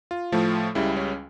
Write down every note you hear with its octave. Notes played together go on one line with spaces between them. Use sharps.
F4
A2 F3 A3
C#2 C#3 G3 E4
C#4